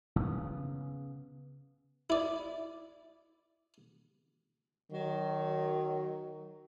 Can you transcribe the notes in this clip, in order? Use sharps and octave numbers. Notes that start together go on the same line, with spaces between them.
C#3 B3
E4 D5
D#3 F#3